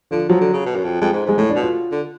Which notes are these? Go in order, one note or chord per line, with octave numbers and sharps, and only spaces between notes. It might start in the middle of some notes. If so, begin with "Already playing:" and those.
D3 F3
F3 F#3
D3
C#3
B2
F#2
F2
F2 G#3
G#2
G#2 G#3
A2 A3
D4
B2
F4
D3